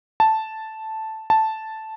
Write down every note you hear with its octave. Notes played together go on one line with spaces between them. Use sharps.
A5
A5